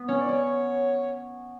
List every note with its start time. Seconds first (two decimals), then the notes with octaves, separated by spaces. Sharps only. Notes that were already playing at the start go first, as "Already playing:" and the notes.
Already playing: B3
0.08 C#4 C#5
0.21 D5
0.29 C#4 C#5